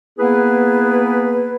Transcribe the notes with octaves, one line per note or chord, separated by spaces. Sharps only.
A#3 B3 E4 G#4 B4